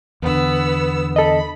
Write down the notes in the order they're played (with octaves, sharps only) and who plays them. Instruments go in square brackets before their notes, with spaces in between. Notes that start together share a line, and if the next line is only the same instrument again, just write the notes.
[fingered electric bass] E2 D3 [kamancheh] B3 E6
[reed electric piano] A4 D#5 [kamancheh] B5